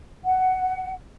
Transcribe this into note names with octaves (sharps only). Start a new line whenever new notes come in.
F#5